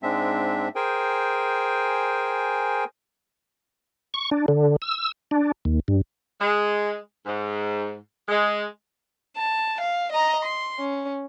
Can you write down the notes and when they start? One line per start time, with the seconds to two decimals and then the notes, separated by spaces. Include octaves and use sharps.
0.03 G#2 G#3 C4 D4 E5
0.76 G#4 A#4 C5 G5 G#5
4.14 C#6
4.31 D4
4.48 D3
4.82 E6
5.31 D4
5.65 D#2
5.88 G2
6.40 G#3
7.25 G#2
8.28 G#3
9.36 A5
9.81 F5
10.12 D#5 A#5
10.45 C6
10.79 C#4